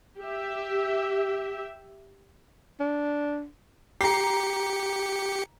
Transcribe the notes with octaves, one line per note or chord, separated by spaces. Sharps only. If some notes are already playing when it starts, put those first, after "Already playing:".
G4 E5
D4
G4 A#5 C7 C#7